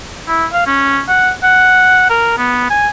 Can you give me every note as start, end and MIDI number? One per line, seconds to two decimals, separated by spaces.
0.28 0.46 64
0.53 0.64 77
0.67 1.00 61
1.08 1.32 78
1.43 2.08 78
2.10 2.36 70
2.38 2.70 59
2.70 2.88 80